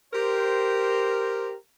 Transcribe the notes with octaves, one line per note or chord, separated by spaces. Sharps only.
G4 A#4 C5